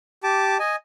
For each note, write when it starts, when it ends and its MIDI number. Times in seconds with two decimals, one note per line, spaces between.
0.24 0.57 67
0.24 0.57 81
0.24 0.57 86
0.59 0.76 75
0.59 0.76 80